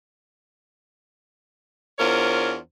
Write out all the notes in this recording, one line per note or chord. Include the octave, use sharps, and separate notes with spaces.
E2 D4 F4 A#4 C5 C#5